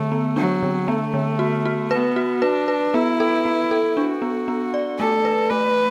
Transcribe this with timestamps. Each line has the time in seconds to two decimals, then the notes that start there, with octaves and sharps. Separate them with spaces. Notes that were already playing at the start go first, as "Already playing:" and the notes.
Already playing: D3 A3
0.12 B3
0.36 F#3 D4
0.63 D3
0.88 A3 B3
1.14 D3
1.39 F#4
1.66 F#4
1.91 B3 B4
2.16 F#4
2.42 D4 B4
2.68 B4
2.94 B3 E4
3.20 A4
3.45 B3
3.71 A4
3.97 D4 F#4
4.22 B3
4.48 B3
4.74 D5
4.99 A3 A4
5.25 B4
5.50 A3 B4